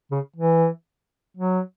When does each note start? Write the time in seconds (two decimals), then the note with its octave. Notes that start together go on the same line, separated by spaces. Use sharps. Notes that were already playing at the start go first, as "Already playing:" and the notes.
0.11 C#3
0.36 E3
1.37 F#3